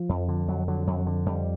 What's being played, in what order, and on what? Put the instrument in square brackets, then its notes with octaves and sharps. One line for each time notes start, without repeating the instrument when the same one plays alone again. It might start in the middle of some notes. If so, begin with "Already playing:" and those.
Already playing: [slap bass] F3
F2
D3
F2 F#3
D3 F#3
F2 F#3
D3
F2 G3